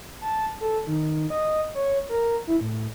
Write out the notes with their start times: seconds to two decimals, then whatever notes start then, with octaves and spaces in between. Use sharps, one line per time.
0.21 A5
0.61 A4
0.87 D#3
1.30 D#5
1.75 C#5
2.09 A#4
2.47 E4
2.61 A2